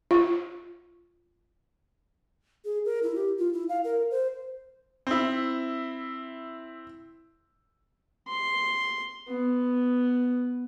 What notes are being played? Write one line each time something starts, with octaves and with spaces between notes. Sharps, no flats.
F4
G#4
A#4
E4
G4
F4
E4
F5
A#4
C5
C4 E4
C6
B3